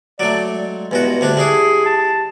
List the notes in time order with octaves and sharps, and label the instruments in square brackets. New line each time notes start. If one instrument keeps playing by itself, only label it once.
[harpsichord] F#3 A3 [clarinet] D5
[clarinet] G#3
[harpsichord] E2 G2 F#4
D2 G3 D4
[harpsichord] G3 D4 E4 [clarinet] G#4
[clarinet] A5